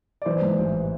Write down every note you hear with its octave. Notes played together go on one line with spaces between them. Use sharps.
D5
E3 C5
G#2
A1